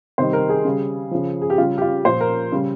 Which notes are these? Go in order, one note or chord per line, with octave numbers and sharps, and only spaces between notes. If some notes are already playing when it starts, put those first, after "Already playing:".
C3 D#3 G3 C5
A#4
G#4
C#3 G3
C#3 F3
G#4
G4
C#3 G3 F4
G4
F4
A#2 F3 C5
A#4
C#3 G3